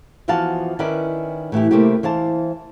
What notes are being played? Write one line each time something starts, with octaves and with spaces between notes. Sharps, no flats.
E3 F3 B3 F#4 F5 A5
D#3 C#4 E4 B4 D5
A2 E3 E4 G4
C3 G3 A3 A#3 C4 G4
E3 C5 F5 A5